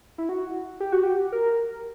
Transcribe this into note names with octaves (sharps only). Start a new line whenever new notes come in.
E4
F#4
G4
F#4
G4
A#4